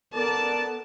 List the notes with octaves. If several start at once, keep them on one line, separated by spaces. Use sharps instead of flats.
B3 A4 A#4 D5 A5